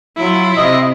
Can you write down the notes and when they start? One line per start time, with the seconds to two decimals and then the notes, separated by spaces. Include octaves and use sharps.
0.17 F#3 E4 F4
0.57 C3 D#5